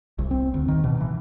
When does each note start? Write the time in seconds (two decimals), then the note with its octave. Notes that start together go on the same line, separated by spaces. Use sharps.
0.19 C2
0.31 C4
0.54 D2
0.68 D#3
0.84 B2
1.01 E3